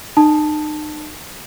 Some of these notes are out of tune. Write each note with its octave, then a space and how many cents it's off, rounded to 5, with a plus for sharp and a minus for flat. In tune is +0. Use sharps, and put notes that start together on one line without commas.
D#4 -35 A5 +0 D#6 +0